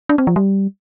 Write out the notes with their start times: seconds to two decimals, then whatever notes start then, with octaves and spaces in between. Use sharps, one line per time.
0.09 D4
0.18 C4
0.27 F3
0.36 G3